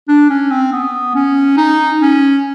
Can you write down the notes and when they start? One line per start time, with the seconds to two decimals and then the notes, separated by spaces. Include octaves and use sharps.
0.09 D4
0.30 C#4
0.51 C4
0.72 B3
1.15 C#4
1.57 D#4
2.01 C#4